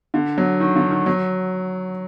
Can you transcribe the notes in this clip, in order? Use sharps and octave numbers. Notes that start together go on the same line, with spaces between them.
D3
F#3
D#3
D3
D#3
F#3